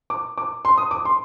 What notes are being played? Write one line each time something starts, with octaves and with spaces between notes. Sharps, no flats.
D6
D6
C6
D#6
D6
C6